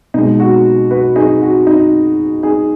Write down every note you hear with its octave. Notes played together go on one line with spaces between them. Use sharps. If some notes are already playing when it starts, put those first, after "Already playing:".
B2 G#3 D#4
F#4
F#4 B4
D#4 G#4
F#4
D#4
D#4 G#4